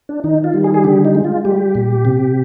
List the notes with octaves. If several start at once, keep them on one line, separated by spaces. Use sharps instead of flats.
D4
D#3 D#4
F4
G3
G#4
G#4
D3 G4
D#4
G#3
F4
G3 G4
A#2
C3